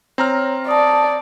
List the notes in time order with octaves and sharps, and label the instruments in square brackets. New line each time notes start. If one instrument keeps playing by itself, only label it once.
[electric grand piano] C4 A#5 F6 [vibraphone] C#5
[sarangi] D5 [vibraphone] A5 D#6